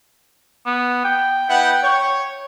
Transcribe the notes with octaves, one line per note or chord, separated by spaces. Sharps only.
B3
G5
B3 E4 F#5
C#5